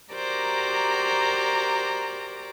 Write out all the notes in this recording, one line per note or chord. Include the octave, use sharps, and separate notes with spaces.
F#4 G4 A#4 C5 D5 A#5